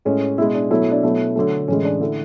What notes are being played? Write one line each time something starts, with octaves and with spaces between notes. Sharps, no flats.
A2 G#3 C#4
B2 G#3 E4
D4
B2 F#3 A3 E4
D4
B2 F#3 A3 E4
D3 F#3 A3
A2 E3 G#3 C#4
D4
D3 A3 E4